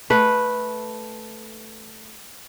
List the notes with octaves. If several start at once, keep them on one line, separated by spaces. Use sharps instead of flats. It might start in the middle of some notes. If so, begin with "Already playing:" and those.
A3 B4